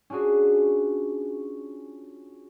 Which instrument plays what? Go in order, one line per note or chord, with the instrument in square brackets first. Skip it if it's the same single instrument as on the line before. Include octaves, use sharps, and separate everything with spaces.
[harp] C#4 D4 F4 F#4 G#4